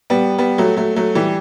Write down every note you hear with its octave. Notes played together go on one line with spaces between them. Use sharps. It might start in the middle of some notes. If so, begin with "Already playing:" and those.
G3 B3
G3 B3
F#3 A3
F#3 A3
F#3 A3
E3 G3